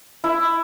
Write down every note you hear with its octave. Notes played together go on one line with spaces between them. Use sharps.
E4